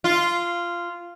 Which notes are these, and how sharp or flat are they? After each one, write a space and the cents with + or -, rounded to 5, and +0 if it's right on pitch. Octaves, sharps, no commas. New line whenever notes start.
F4 -10